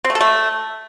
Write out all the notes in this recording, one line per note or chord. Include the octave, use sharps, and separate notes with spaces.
C4
A3
A4
A3